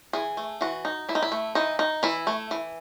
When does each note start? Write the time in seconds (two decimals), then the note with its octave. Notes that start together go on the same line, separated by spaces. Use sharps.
0.13 E3 G#4
0.37 A3
0.61 E3 F#4
0.85 D#4
1.09 E3 E4
1.15 D#4
1.22 E4
1.32 A3
1.55 E3 D#4
1.79 D#4
2.03 E3 E4
2.27 A3
2.51 E3